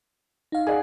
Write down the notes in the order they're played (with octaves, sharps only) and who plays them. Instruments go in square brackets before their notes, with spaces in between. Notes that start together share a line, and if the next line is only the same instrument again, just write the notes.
[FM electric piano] D#4 F5
[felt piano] G#4 D5 F#5